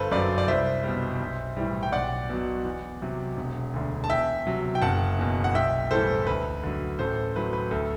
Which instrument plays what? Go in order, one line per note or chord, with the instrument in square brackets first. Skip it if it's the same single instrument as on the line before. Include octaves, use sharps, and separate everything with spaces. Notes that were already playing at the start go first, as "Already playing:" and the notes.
Already playing: [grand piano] G1 A4 B4 C5
F#2 F#3 B4 D5
D5
C2 C5 E5
B2 G3
B1
A2 E3 G3
G5
B1 D5 F#5
B2 F#3
E2
C3 F#3
E1
D2 D3
A5
E2 E5 G5
C3 F#3
G5
F#1 F#5 A5
E2 B2
F#5
B1 E5 G5
A2 E3 G3 A4 C5
D2 B4
D3 F#3
A1 A4 C5
A2 F#3 B4
B4
D2 A4